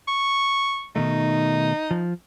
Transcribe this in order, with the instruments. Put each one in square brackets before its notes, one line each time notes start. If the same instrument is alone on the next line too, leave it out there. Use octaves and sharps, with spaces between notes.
[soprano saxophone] C#6
[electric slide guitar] B2 D#3 A3 [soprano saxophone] D#4
[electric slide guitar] F3